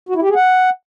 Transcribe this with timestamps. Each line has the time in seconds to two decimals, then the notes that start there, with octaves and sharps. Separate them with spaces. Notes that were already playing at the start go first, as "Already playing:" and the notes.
0.09 F#4
0.16 E4
0.22 G4
0.29 G#4
0.35 F#5